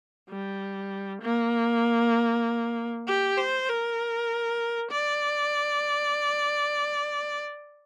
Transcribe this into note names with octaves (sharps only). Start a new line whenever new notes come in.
G3
A#3
G4
C5
A#4
D5